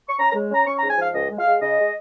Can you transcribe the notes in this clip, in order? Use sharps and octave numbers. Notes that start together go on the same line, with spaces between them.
C#6
C#4 A#5
A#5
G#3
C#4 A#5
C#4 C#6
A#5
G#2
G#5
F3 F5
C#2 D#5
G#3
F5
G#3
C#3 D#5
G#3